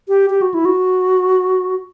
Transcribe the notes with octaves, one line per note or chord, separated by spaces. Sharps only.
G4
G4
F#4
E4
F#4